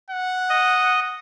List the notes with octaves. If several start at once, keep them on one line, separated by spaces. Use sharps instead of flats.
F#5
D#5